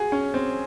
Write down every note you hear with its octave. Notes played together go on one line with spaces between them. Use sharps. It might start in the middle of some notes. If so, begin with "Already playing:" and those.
Already playing: F#4 G#4
C#4
C4